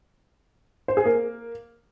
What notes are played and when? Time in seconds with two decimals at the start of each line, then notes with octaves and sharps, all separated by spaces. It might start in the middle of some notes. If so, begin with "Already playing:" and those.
0.88 C5
0.97 G#4
1.05 A#3